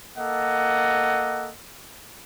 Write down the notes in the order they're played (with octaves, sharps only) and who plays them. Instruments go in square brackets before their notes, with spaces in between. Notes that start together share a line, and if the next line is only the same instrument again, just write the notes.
[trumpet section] A#3 A4 D#5 F#5